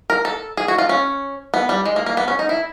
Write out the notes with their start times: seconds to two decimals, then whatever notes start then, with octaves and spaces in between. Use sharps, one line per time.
0.10 A#4
0.25 A4
0.57 G#4
0.68 F#4
0.78 F4
0.89 C#4
1.54 B3
1.69 G3
1.85 G#3
1.96 A#3
2.06 A#3
2.17 B3
2.28 C#4
2.39 D#4
2.49 E4